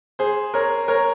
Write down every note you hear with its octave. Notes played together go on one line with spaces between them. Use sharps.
G#4 C5
A#4 C#5
A#4 C#5